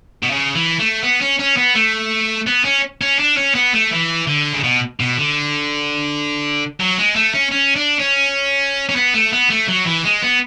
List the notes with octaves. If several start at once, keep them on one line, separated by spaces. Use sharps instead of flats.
B2
C#3
E3
A3
B3
C#4
C#4
B3
A3
B3
C#4
C#4
D4
C#4
B3
A3
E3
D3
C#3
B2
B2
D3
F#3
G#3
A3
C#4
C#4
D4
C#4
C#4
B3
A3
B3
A3
F#3
E3
G#3
B3